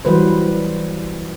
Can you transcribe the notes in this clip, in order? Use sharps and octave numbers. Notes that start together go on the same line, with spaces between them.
E3 F#3 G3 B4 C5